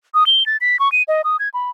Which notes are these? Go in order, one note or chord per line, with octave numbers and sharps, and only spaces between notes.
D#6
G7
A6
B6
C#6
D#7
D#5
D#6
G#6
B5